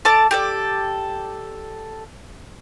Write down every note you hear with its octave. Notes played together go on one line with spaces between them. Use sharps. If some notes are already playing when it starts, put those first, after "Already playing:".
A4 D5 A5 D6
G4 A4 D5